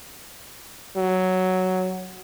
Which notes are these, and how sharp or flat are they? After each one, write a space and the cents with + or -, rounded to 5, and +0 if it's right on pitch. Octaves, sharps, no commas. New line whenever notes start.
F#3 +5